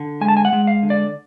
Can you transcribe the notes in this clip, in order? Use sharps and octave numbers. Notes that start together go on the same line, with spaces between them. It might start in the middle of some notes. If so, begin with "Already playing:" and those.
Already playing: D3
G#3 G#5
A5
G#5
F#5
G#3
F5
D3
D5